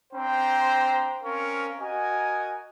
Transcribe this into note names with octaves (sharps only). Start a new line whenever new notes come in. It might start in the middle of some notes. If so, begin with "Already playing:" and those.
C4 D4 C5 G5 A#5
C4 C#4 A#4 F5 C#6
F#4 A#4 D#5 G#5